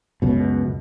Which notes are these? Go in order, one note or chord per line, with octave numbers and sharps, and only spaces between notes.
C#2 F#2 B2